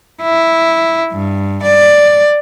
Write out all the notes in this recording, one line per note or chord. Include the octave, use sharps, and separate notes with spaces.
E4
G2
D5